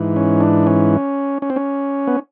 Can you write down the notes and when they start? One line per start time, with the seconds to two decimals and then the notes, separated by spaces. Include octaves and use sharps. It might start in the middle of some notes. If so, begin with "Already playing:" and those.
Already playing: G#2 E3
0.16 C#4
0.41 D4
0.67 C#4
1.42 C#4
1.50 C4
1.56 C#4
2.07 B3